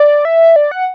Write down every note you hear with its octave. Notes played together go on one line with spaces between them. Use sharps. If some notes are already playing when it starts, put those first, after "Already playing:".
Already playing: D5
E5
D5
F#5